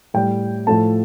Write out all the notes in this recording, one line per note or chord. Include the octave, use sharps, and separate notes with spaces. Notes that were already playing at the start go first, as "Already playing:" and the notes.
A2 G3 G5
A2 F3 A3 A5